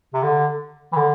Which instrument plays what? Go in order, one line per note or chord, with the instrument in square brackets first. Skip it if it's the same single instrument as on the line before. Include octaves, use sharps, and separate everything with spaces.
[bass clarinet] C3
D3
E3
D3